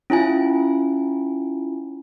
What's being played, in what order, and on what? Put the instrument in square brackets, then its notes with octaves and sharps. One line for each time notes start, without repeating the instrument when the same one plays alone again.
[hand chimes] C#4 E4 F4 G#5